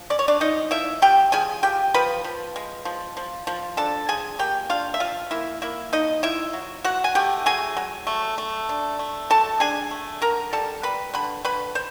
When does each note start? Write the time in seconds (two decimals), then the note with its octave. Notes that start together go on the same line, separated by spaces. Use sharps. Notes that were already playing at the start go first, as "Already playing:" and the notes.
Already playing: F3
0.10 C#4 D5
0.19 C#5
0.28 D4 D5
0.40 F3 D#4 D#5
0.71 F3 E4 E5
1.02 F3 G4 G5
1.32 F3 G#4 G#5
1.63 F3 G4 G5
1.94 F3 B4 B5
2.24 F3
2.56 G#3
2.85 F3
3.17 F3
3.47 F3
3.77 D4 A4 A5
4.09 F3 G#4 G#5
4.39 A#3 G4 G5
4.70 D4 F4 F5
4.94 E5
5.00 F3 F4 F5
5.31 A#3 E4 E5
5.62 A#3 E4 E5
5.92 F3 D#4 D#5
6.23 F3 E4 E5
6.53 F#3
6.84 F#3 F#4 F#5
7.04 G#5
7.15 A3 G4 G5
7.46 F#3 G#4 G#5
7.77 F#3
8.07 A3
8.38 A3
8.69 D4
8.99 A3
9.30 F#3 A4 A5
9.60 D4 G#4 G#5
9.91 A3
10.22 D3 A#4 A#5
10.52 G3 A4 A5
10.83 G3 B4 B5
11.14 D3 B4 B5
11.45 D3 B4 B5
11.75 C5